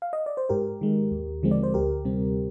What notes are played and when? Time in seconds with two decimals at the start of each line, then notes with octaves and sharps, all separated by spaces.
0.02 F5
0.13 D#5
0.26 D5
0.37 C5
0.49 G#2 G4 A#4
0.81 D#3 G#3
1.11 D#2
1.43 D3 F3 G#3 C4
1.51 D5
1.63 C5
1.74 D2 G4 A#4
2.05 C3 G3 C4